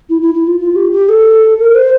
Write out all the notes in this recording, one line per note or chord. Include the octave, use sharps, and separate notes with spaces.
E4
E4
E4
F4
F4
G4
G4
A4
A#4
C5